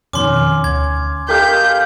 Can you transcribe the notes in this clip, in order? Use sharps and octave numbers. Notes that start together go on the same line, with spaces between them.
F2 B2 D#3 C#4 C6 D6
D2 G#6
G4 A4 A#4 D#5 F5 G6